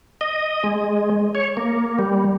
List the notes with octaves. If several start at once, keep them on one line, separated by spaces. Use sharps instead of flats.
D#5
G#3
C#5
A#3
G3